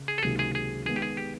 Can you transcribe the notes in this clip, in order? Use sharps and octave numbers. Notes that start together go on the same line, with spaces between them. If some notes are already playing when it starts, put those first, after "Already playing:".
Already playing: C#3
G#4
A4
C#2 C3 D#3 F#3 A#3 G#4
G#4
G#4
D#3 G#3 B3 G#4
G4
G#4
G4